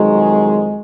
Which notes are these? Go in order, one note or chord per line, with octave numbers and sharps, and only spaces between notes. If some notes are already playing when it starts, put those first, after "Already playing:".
Already playing: F2 D#3 F#3 G#3